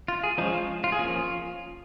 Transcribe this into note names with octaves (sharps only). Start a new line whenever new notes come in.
F4
G#4
F3 G#3 C#4 D#4
F4
F4
G#4
F3 A#3 C#4 F4